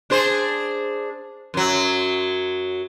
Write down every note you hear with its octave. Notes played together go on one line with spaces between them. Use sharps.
D4 G#4 C5
F#2 F#3